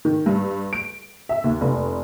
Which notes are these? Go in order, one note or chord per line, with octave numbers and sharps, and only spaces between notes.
D#3
G2
D7
E5
D#2
F1